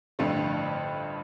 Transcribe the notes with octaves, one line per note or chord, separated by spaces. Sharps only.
A1 G2 D3 F3 A3